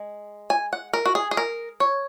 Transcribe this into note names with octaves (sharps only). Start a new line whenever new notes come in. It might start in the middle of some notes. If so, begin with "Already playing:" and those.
Already playing: G#3
G#5
F#5
A#4
F#4
G#4
G#4
A#4
C#5